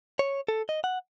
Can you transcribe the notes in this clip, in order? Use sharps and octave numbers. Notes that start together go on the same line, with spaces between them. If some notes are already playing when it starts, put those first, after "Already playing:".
C#5
A4
D#5
F#5